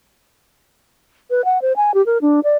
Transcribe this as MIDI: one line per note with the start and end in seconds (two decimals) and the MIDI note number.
1.30 1.45 71
1.45 1.61 78
1.62 1.73 72
1.76 1.94 80
1.94 2.04 67
2.06 2.18 70
2.21 2.40 62
2.44 2.57 74